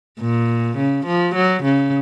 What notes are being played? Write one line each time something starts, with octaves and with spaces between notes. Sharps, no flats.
A#2
C#3
F3
F#3
C#3